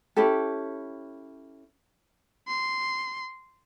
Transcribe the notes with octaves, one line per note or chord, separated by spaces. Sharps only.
C#4 E4 G4 A4
C6